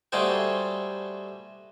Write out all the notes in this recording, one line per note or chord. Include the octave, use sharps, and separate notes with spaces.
G3 A3 F#4 G#4 C5 G5